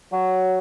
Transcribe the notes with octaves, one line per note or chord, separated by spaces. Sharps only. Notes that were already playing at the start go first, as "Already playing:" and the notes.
F#3